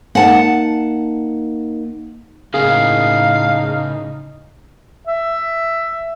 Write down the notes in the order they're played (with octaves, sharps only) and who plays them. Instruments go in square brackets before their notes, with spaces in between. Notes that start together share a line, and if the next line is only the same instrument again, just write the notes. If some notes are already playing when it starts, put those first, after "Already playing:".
[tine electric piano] A#3 D#4 [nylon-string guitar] F#5 A5
[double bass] A2 D#4 [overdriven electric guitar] C#3 A#3 [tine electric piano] G#4 [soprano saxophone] F5
[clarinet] E5